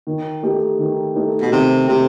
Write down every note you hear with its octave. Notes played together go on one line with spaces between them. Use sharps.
D#3
A3 D#4 G4
D#3
A3 D#4 G4
B2
C3 D#3
C3 A3 D#4 G4